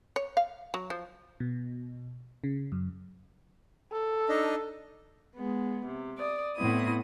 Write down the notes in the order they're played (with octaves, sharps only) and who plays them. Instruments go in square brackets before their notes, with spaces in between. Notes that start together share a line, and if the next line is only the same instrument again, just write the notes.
[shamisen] C#5
F5
F#3
F3
[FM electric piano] B2
C#3
F#2
[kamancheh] A4
[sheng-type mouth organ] D4 D#4 D#5
[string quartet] G#3 B3
C3
D5 D#6
A2 B3 C4 E4 D#6